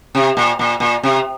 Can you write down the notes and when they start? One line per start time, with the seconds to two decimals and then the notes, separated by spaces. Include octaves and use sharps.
0.15 C3
0.37 A#2
0.59 A#2
0.80 A#2
1.03 C3